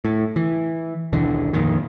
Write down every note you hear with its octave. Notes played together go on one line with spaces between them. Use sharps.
A2
E3
D#1 B1 D3 E3
F2 A#2 D#3